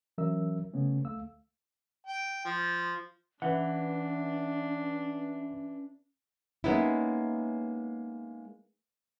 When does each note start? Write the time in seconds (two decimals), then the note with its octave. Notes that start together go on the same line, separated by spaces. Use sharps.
0.18 E3 F#3 C#4 A#4 E5 E6
0.74 C#3 A3 B3 C#4
1.05 D2 A3 F5 E6
2.07 G5
2.45 F3
3.42 E3 C#4 D4 B4 F#5
6.64 G#3 A#3 B3 C#4 D#4 E4